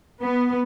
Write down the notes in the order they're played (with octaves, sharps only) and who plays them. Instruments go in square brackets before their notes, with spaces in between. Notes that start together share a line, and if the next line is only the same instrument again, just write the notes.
[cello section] B3